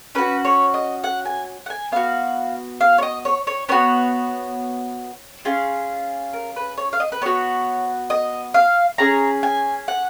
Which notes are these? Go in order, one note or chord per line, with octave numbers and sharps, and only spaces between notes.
C#4 F#4 B4
C#5
D#5
F#5
G#5
F#5
G#5
B3 F#4 F5
F5
C#5
D#5
C#5
C#5
B3 F#4 C#5
C#4 F4 G#4
A#4
B4
C#5
F5
D#5
B4
B3 F#4 C#5
D#5
F5
C#4 G#4 A#5
G#5
F#5